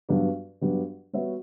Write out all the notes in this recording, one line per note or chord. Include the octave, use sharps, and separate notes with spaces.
G2 F#3 B3 D4 G4
G2 F#3 B3 D4 G4
G3 B3 F#4 C#5 E5